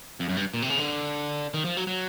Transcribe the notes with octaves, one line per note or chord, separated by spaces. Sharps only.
F2
F#2
G2
A#2
C3
C#3
D3
D#3
F3
F#3
F#3